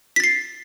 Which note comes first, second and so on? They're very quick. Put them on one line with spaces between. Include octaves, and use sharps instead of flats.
B6 A6 C7